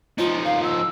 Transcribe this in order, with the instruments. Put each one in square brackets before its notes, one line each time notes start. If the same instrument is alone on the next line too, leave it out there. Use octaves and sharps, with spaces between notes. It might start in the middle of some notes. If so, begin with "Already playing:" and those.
[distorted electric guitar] F3 D#4 [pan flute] F4
[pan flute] F5
E6